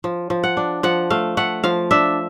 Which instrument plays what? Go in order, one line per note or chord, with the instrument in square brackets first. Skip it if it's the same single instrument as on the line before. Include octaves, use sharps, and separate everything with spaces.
[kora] F3
F3
F#5
D4
F3 F#5
A3 F5
A3 F#5
F3 F5
D4 E5